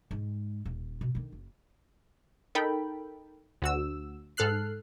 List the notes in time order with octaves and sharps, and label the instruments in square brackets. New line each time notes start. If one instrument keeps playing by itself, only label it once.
[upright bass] G#2 G#3
D#1
B2
D3 D#3
F#1
[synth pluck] D#4 A4 A#4 G5 B5
D2 F#4 E6
G#2 A4 F6 F#6 C7